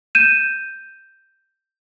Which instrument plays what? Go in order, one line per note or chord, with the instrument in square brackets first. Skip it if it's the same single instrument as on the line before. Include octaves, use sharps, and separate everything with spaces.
[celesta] G6 D#7 E7